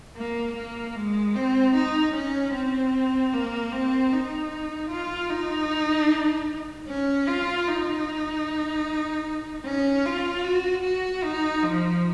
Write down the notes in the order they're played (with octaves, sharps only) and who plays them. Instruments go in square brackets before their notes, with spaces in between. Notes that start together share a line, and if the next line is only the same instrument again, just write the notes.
[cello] A#3
A#3
G#3
C4
D#4
C#4
C4
A#3
C4
D#4
F4
D#4
C#4
F4
D#4
C#4
F4
F#4
F#4
D#4
F3